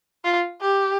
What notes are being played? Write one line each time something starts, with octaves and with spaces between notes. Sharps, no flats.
F4
G4